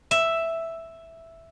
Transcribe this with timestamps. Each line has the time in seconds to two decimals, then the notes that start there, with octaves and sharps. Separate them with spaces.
0.11 E5